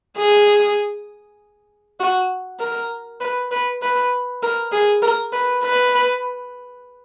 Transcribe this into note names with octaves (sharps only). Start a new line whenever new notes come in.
G#4
F#4
A#4
B4
B4
B4
A#4
G#4
A#4
B4
B4